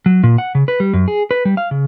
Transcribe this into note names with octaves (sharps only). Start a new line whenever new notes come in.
F#3
A#2
F#5
C#3
B4
G3
F#2
G#4
B4
G3
F5
C#3